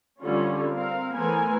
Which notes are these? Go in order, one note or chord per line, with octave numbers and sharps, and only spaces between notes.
D3 G3 C#4 F4 C#5
C4 A#4 F5
E3 A3 B3 A#4 C5 G#5